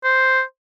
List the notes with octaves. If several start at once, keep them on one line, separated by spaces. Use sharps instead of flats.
C5